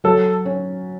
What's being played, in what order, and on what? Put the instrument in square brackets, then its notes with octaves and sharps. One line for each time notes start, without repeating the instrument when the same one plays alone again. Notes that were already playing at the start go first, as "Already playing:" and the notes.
[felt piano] F#3 [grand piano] A4
[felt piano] C#4